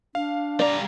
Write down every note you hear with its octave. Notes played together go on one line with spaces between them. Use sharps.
D4 F5
G3 D5 A#5